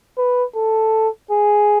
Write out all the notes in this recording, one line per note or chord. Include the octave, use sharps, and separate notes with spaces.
B4
A4
G#4